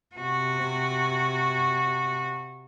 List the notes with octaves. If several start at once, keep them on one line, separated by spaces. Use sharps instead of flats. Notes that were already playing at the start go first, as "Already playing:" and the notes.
C3 F#4